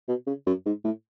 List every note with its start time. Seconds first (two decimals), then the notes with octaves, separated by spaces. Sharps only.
0.08 B2
0.27 C#3
0.47 F#2
0.66 G#2
0.85 A2